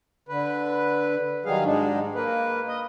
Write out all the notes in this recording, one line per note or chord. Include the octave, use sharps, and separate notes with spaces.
D3 B4
D#3 F#3 G3 G#4 F5
G#2 G#3 D4 D#4
A#3 B4
D#5